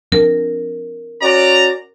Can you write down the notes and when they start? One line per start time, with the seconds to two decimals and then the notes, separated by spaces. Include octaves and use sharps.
0.12 F3 C4 D4 A#4
1.22 C#4 F#4 D5 A#5